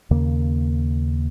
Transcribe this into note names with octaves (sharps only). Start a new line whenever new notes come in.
D#2 C#3 A#3